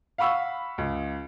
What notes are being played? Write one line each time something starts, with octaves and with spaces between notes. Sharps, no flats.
F5 F#5 B5 C#6 E6
C#2